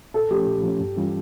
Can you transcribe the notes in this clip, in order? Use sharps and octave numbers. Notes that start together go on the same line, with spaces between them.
A#2 A4
F3 A3 C#4 G4
A#2
F3 A3 C#4
G2
E3 G3 C#4 F4